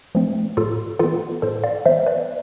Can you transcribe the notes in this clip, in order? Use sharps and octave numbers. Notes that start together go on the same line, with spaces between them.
F3 A3 C4
A2 F4 A4
E3 B3 F4 A4
A2 A4 C5
D5 F5
E3 B3 C5 E5
B4 D5